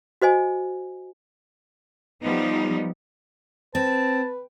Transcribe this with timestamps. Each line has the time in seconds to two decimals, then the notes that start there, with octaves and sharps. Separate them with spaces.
0.22 F#4 C5 D#5 G#5
2.21 F3 G3 B3 D#4
3.75 C4 B4 A5